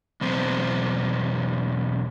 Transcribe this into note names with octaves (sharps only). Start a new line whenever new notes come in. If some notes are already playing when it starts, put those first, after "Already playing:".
E2 B2 F#3 C4 C5